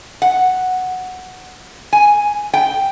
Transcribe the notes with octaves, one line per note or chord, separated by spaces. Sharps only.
F#5
G#5
G5